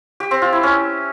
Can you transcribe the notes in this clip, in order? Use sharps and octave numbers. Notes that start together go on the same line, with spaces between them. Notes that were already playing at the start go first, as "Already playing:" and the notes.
G4
C4
F4
E4
C#4